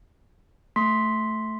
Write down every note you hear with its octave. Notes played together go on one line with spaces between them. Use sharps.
A3 C6 B6